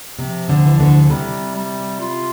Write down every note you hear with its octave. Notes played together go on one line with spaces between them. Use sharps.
C3 F3
D2 D3
E3
D2 D3
C3 G3
G3
F4